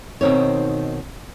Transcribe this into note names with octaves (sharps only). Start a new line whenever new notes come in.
B2 D#3 C4 D#4 C#5